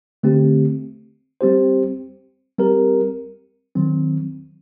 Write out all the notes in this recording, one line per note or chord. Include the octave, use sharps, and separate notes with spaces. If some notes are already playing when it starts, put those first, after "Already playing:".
D3 A3 C4 G4
G3 C4 G4 C5
G3 C4 G4 A#4
D#3 F#3 C4